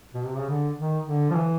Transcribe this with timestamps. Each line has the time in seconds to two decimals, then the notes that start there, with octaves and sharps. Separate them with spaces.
0.14 B2
0.25 C3
0.38 C#3
0.49 D3
0.79 D#3
1.07 D3
1.31 F3
1.35 E3